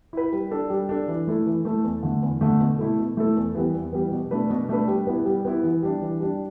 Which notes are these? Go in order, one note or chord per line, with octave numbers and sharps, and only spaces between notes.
E4 B4
G3
D4 A4
G3
D4 A4
E3
A3 E4 A4
E3
A3 E4 A4
E2
D3 A3
E2
D3 A3
B2
A3 E4 A4
B2
A3 E4 A4
E2
E3 G3 B3
E2
E3 G3 B3
B2
A3 D4 B4
B2
A3 D4 B4
G3
B3 E4
G3
B3 E4
E3
G3 D4
E3
G3 D4